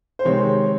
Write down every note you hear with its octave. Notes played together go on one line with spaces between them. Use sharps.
C5
C3 D#3 G#3 C4 C#5